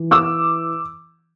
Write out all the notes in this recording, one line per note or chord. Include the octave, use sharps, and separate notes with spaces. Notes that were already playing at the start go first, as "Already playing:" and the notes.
Already playing: E3
D6 E6